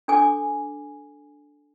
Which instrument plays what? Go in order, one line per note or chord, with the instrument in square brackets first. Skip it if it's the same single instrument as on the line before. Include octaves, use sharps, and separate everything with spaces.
[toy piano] D4 A4 G#5 D6